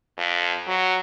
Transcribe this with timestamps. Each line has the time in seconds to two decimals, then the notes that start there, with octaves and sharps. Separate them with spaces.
0.18 F2
0.67 F#3